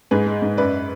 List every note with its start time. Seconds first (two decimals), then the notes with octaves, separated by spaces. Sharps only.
0.11 G#2 G#4 B4
0.27 G#3
0.42 G#2
0.57 F#2 B4 D5